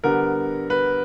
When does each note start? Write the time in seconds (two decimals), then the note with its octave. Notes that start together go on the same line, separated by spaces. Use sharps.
0.04 D3 G3 B3 A#4
0.70 B4